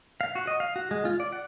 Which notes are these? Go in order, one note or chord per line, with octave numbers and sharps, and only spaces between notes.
F5
F#4
D#5
F5
F#4
G#3
F4
D5
F#5